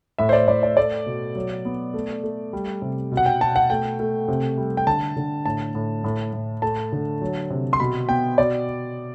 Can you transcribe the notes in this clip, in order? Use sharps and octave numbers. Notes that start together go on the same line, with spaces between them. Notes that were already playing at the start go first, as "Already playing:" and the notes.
A2 E5
C5
D5
A2 D5
D5
A3 D5
B2
F#3
B3
A3
A3
G3
C3
B2
F#5
G5
B2 A5
F#5
A3 G5
A3
C3
G3
G5
D3 A5
D3
A2 A5
A2
A2
A2
A3 A5
D3
F#3
C3
C6
B2 B5
B3 G5
B2 D5